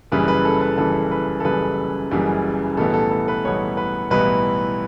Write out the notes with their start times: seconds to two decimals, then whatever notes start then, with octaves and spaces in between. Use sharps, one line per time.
0.12 F#1 F#2 C#3 E3 G3 B4
0.28 B4
0.45 A4
0.61 B4
0.78 F#1 F#2 C#3 E3 G3 A4
1.11 B4
1.40 A4
1.44 F#1 F#2 C#3 E3 G3 B4
2.11 F#1 F#2 C#3 E3 G3
2.77 B1 A2 E3 G3 B3 A4
2.94 A4
3.11 A4
3.28 B4
3.45 B1 A2 E3 G3 B3 C#5
3.77 B4
4.10 B1 A2 E3 G3 B3 B4